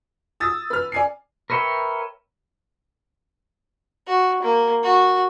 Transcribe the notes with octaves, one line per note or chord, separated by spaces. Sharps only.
D#6 E6 A6
B4 F6
D5 G#5 C7
A#4 B4 C#5 E5 G5
F#4
A#3
F#4